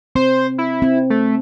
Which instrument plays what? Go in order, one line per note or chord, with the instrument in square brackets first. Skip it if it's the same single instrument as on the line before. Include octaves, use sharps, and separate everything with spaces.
[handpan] C4 [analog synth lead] C5
[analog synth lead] E4
[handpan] C4
[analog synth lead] A3